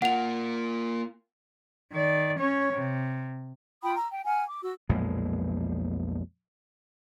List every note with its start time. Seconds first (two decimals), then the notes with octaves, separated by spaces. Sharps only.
0.02 A#3 F4 F#5 F7
1.92 D#3 D5
2.39 C#4 C#5
2.73 C3
3.83 F4 G5 B5 D#6
3.96 A#5 E6
4.11 G5
4.25 F#5 G#5 F6
4.47 D6
4.63 F#4 E6
4.89 B1 F2 A#2 G#3